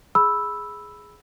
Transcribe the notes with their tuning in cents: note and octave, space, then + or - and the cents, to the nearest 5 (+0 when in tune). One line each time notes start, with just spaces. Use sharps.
G#4 +5 B5 +0 E6 +0